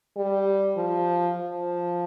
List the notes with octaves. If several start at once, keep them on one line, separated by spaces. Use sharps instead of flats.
G3
F3
F3